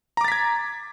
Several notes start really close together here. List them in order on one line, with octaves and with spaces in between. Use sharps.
A#5 D6 A6 B6 G#6